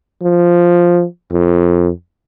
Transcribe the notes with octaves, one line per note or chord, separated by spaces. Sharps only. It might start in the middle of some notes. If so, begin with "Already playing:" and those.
F3
F2